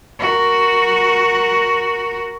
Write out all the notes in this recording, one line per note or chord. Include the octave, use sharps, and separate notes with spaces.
F#4 A#4